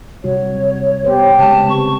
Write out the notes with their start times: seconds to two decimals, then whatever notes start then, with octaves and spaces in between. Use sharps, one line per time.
0.24 C3 G3 F#4 C#5
1.05 B3 G4 B4 C5
1.39 C#3 G#3 A5
1.69 C4 B4 C#6